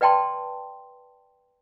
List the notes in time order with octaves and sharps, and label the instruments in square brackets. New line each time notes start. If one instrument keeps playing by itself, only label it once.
[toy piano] B4 D5 G5 A5 C6